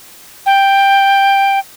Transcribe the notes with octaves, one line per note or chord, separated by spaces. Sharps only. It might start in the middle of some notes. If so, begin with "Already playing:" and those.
G5